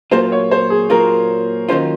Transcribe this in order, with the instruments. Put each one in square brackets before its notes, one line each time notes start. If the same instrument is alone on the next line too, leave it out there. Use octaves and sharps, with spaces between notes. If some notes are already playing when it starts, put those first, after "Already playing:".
[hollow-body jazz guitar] A#2 F#3 A#3 F4 [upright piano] C5
[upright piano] C#5
C5
G#4
[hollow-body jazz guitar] A#2 F#3 A#3 F4 [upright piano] A#4
[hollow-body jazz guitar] D#3 F#3 A#3 C#4 F4 [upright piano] C5